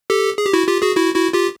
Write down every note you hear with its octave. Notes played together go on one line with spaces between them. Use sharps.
G4 A4
G#4
G4
E4 F#4
F4 G4
F#4 G#4
E4 F#4
E4 F#4
F4 G4